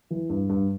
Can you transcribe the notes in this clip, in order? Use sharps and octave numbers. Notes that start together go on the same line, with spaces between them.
E3
G2
G2